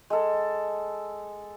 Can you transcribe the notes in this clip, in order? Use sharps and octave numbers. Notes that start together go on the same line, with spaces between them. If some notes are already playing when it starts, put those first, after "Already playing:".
G#3 A4